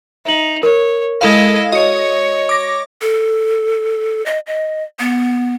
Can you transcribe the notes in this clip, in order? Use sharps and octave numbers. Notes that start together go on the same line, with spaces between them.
D#4 E5 F#7
A#4 C#5
G#3 E4 A4 D#5 F5
F#4 C#5 D#5 C#7
D6 A#6
A4
D#5
D#5
B3